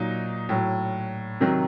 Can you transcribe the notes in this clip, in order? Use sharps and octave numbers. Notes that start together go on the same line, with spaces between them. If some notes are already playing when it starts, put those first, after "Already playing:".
Already playing: A#2 F#3 D#4
A2 F#3
C3 D#3 F#3